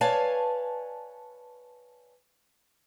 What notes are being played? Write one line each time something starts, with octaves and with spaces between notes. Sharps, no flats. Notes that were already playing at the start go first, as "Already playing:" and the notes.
B4 C#5 D5 F5 G#5 A5